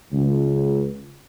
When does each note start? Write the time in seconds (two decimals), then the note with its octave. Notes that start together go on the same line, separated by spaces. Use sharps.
0.12 C#2